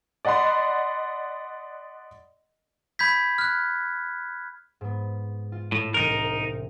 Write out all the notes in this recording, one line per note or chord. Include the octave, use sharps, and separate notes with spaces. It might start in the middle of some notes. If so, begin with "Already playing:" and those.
D5 D#5 F#5 B5 C6
B5 G6 G#6 B6
F6 F#6
G#2 B3
F4
A2
E1 C2 A2 D#4 A#4